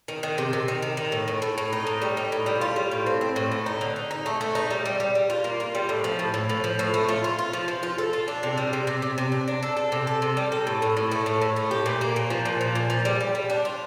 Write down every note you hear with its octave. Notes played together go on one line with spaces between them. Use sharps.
D#3
D#3
C3
C3
D#3
D#3
D#3
A2
A2
A2
A2
D#4
A2
G3
D#4
A2
G3
F4
G3
A2
C4
C4
A2
A3
D#4
D3
D#4
D#4
A3
A3
D#4
G3
G3
G3
G3
F4
A#3
F4
G3
A2
F3
A2
A2
F3
F3
A2
A3
F4
F4
F4
F3
F3
F4
A4
F4
D4
C3
G3
C3
C3
C3
C3
D4
D4
A4
A4
C3
A4
C3
G3
A4
A2
A2
A2
A3
A2
A2
A3
G4
A#2
A#3
A#2
F3
A#2
F3
A#2
F3
G3
G3
G3
D4
F4